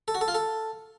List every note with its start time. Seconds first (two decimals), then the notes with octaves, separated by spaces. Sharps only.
0.08 A4
0.15 F#4
0.21 A4
0.28 F4
0.35 A4